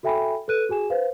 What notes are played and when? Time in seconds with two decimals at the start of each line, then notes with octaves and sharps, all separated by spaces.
0.03 F#4 A4 E5 G5 G#5 B5
0.48 A4 B4 F#6 D#7
0.69 F#4 G#4 G#5 E7
0.90 B4 C5 F5